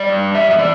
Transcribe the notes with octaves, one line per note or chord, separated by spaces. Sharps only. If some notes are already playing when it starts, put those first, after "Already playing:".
Already playing: G3 D5
G2
G2 E5
E5
E3 D5